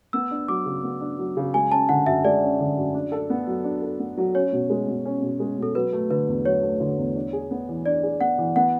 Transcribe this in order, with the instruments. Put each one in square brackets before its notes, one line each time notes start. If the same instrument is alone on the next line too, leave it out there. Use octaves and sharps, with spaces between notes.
[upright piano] B3 [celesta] E6
[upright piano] D4
[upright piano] F#3 [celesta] D6
[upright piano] C#3
B3
D4
F#3
C#3
[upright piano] G#3 [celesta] G#5
[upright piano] C#4 [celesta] A5
[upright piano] D3 [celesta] F#5
[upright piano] F#2 [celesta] E5
[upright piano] G#3 [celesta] D5
[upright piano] C#4
D3
F#2
D4
A4
B3
F#3
D4
A4
B3
F#3
[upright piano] C#4 [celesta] C#5
[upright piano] B2
G#3
B2
C#4
B2
G#3
[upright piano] B2 [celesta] A4
[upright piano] F#3 [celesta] B4
[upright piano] A3
[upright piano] D3 [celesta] B4
[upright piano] E2
[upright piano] F#3 [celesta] C#5
[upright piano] A3
D3
E2
D4
G#4
B3
E3
[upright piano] D4 [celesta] D5
[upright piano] G#4
[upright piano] B3 [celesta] F#5
[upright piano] E3
[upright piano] B3 [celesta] F#5